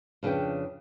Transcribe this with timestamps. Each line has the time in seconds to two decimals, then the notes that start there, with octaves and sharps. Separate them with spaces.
0.23 F2 C#3 D4 B4 G5